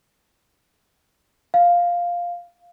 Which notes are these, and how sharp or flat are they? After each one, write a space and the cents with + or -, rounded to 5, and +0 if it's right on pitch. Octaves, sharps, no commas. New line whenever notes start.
F5 +0